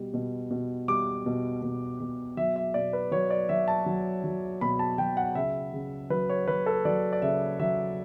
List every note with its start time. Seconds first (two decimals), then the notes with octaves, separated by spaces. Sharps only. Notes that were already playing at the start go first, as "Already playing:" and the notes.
Already playing: B2 G3
0.14 B2
0.51 B2
0.88 G3 D6
1.26 B2
1.62 B2
2.00 B2
2.37 F#3 E5
2.56 E5
2.74 B2 D5
2.93 B4
3.11 F#3 C#5
3.30 D5
3.49 F#3 E5
3.68 A5
3.86 F#3
4.24 F#3
4.61 B2 B5
4.79 A5
4.98 F#3 G5
5.17 F#5
5.35 C#3 E5
5.73 C#3
6.10 F#3 B4
6.30 C#5
6.48 F#3 B4
6.66 A4
6.85 F#3 D5
7.13 D5
7.22 C#3 E5
7.59 F#3 E5